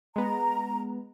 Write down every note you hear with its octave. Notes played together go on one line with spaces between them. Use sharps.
G#3 B3 A#5